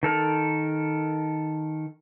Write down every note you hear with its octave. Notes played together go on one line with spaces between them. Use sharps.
D#3 A4 A#4